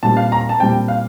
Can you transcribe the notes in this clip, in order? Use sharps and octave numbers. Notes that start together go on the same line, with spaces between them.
A#2 G3 C4 A5
F5
A#5
A5
A#2 G3 C4 G5
F5